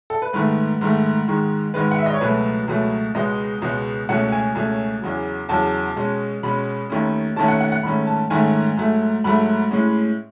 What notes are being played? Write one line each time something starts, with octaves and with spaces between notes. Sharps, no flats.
A4
B4
G#2 D#3 A3 B4
G#2 D#3 A3
G#2 D#3 G#3
G#2 D#3 G#3 B4
F#5
E5
D#5
C#5
C#2 B2 F#3 A3 B4
C#2 B2 F#3 A3
C#2 B2 G#3 B3 D#5
C#2 B2 G#3 B3
C#2 B2 A3 C#4 F#5
G#5
C#2 B2 A3 C#4
E2 C#3 F#3
E2 C#3 F#3 A5
B2 G#3 C#4
B2 G#3 C#4 B5
D#2 D#3 A3 C#4
D#2 D#3 A3 C#4 A5
F#5
F#5
F#5
G#2 D#3 A3 C#4 B5
A5
G#2 D#3 A3 C#4 G#5
G#2 F#3 A3
G#2 F#3 A3 B5
A2 G#3 C#4